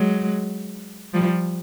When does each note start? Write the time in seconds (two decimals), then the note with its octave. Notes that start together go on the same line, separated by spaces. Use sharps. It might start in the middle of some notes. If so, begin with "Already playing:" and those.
Already playing: F#3 G#3
1.13 F3 G3